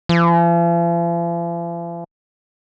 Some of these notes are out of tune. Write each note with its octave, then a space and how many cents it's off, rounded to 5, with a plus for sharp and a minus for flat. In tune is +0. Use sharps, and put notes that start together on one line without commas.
F3 -45